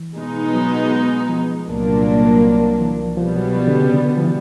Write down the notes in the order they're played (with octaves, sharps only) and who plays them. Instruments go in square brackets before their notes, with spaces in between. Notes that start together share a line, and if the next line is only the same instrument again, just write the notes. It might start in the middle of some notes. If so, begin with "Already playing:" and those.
Already playing: [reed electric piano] E3
[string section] B2 G#3 B3 D#4
[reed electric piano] F#3
F3
[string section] C2 A#2 F#3 A#3 D4
[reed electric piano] E3
F3
[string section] B2 G3 B3 [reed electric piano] F3
[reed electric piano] F#3
F3
D3
C#3
D3
F3
E3